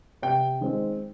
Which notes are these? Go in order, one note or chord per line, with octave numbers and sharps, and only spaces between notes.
C3 G5
D#3 G#3 C4